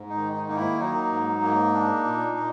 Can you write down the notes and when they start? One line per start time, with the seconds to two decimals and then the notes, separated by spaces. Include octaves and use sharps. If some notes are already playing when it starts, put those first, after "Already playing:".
Already playing: G#2
0.09 D#4
0.17 D#3
0.33 D#4
0.48 A#3 D#4
0.56 E4
0.80 F#3 D#4
1.12 G#2
1.43 A#3
1.74 D4
2.05 A#2
2.37 A#2